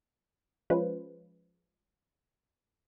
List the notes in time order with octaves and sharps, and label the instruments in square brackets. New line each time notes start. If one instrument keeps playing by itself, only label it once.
[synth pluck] F3 G#3 C#4 F4 B4 C5